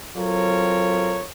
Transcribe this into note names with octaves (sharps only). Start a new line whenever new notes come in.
F#3 C4 F4 A4 A#4 C#5